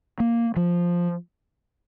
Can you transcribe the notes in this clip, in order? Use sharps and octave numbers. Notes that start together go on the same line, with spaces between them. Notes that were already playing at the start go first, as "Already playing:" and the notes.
A#3
F3